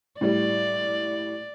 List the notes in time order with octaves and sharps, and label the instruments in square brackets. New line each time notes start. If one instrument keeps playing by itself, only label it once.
[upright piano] A2 G3 [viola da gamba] D5